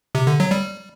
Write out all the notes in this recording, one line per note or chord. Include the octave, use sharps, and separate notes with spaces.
C3
D3
F#3
G3